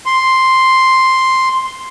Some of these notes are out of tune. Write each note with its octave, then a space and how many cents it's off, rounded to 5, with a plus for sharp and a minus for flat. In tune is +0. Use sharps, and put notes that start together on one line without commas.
C6 +0